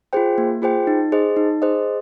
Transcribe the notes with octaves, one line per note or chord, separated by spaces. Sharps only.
F4 G#4 C5 G5
A#3
F4 G#4 C5 G5
D#4
G#4 C5 D#5
D#4
G#4 C5 D#5